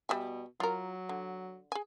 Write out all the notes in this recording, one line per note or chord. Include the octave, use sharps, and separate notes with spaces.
B2 G3 E5 G#5
F#3 F4 A#4
D3
G#4 G#5